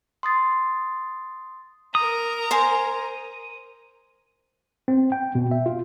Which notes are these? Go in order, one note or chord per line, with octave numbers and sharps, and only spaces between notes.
C6 D#6 A6 C7
A#4 A#5 D#6
C5 G#5
C4
G5
B2
E5
F4